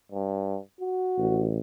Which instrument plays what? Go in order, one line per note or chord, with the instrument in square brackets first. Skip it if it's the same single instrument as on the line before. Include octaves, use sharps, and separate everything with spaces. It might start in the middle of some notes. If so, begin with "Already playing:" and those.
[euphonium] G2
F#4
[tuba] A1